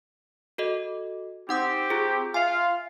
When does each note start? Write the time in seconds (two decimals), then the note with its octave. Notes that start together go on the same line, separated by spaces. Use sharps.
0.58 F#4 A4 D#5
1.49 C4 D#4 G4 F#5 D#6
1.90 F4 G#4
2.34 F4 E5 F5 G#5